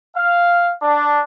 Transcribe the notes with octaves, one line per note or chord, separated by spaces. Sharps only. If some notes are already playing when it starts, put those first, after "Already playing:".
F5
D4